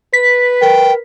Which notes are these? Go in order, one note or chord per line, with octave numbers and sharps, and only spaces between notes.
B4 B6
A#4 G5